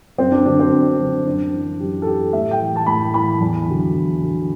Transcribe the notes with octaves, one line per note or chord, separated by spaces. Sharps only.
F#2 C4
D4
D3 F#3 D4
C4
F#2
D3 F#3
F#2 D4
E3
F#2 G4
A4
E3 G4
A2 E5
G5
E3
A5
A2 B5
E3 B5
E2
D3 F#3
E2
D3 F#3